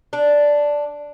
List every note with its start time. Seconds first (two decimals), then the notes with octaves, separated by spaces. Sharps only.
0.13 D4